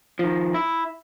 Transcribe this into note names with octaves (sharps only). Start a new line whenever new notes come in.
D#3 F3
E4